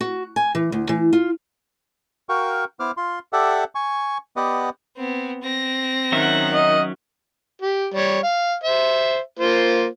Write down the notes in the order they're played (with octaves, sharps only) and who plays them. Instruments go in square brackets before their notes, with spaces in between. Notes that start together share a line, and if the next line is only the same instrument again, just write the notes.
[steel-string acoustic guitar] F#4
G#5
E3
D2
E3
F4
[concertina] F#4 A#4 F5 G5 C#6
B3 E4 C5 D6 F6
F4 C6
G4 A4 D5 E5 F#5
G#5 C#6
B3 G4 B4 D5 D#5 F#5
[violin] B3 C4
C4 A#6
[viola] D#3 F#5 [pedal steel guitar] F#3 C#4 E5
[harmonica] D#5
G4
G3 C#5
F5
C5 E5
A#3 F4 C5